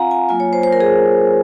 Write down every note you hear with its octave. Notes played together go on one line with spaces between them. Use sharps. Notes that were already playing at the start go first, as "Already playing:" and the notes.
Already playing: C4 F4 F5 F#5 G#5 A#5
G#5
F#3 A#3 F4 G#5
C#5
C5
C5
A#4
G#4